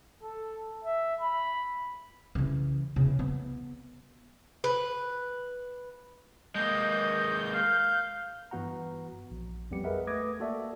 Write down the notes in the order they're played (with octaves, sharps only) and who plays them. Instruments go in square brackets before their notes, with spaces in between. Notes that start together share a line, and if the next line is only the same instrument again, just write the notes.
[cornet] A4
E5
B5
[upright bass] C#3 E3
E2 C#3
B3
[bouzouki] B4
[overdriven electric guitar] G#3 A#3 [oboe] D#5 [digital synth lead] G6
[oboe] F5
[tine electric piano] G2 E3 B3 F#4 F#5 A#5
A#1
F2 F#3 G3 B3 G4 C#7
G#4 A#4 B4 D#5 E5 F#5
A3 B4 D6 D#6 G#6 A#6
A#3 F#4 A4 D5 E5